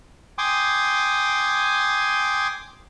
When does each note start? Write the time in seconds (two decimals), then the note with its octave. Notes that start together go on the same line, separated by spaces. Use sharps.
0.38 G5 G#5 C6 D6 D#6